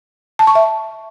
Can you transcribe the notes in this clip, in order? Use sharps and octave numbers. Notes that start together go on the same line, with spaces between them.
A5
C#6
E5